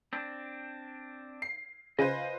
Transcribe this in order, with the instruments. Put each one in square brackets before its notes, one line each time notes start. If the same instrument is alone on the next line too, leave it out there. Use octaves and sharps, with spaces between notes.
[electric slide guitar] C4 D4
[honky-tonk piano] C7
[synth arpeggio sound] C#3 [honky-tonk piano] F4 B4 C5 [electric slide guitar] D#5 G#5